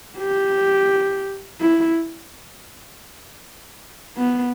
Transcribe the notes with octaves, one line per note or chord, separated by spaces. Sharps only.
G4
E4
B3